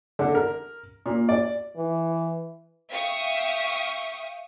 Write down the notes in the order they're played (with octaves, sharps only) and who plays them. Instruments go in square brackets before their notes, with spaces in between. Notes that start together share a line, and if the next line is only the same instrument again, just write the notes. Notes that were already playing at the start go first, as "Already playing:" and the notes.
[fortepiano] D3
A#4
A#2
D5
[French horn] E3
[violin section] E5 F5 G5 C#6 D#6